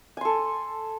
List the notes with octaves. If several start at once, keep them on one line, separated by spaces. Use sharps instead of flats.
A4 G#5 C6